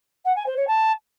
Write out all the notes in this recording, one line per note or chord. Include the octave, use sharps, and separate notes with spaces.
F#5
G#5
C5
C#5
A5